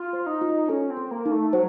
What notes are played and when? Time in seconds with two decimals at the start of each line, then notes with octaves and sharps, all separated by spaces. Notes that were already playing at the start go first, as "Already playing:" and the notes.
Already playing: F4
0.13 C5
0.26 D#4
0.41 F4
0.68 C#4 A4
0.90 C4
0.97 A4
1.11 A#3
1.26 D#4
1.31 A3
1.53 F#3 C5